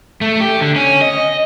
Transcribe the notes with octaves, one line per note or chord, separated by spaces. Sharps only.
A3
G4
D3
C#4
D#5